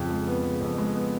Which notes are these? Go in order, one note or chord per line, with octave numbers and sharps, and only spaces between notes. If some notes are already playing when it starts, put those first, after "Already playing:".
Already playing: F2 C#3
G#3
B3
C#3
F2
G#3
B3